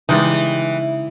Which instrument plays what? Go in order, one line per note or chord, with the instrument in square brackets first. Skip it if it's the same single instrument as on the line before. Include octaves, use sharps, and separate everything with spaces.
[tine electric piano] C#3 [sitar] E3 [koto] G3 G#3 D#4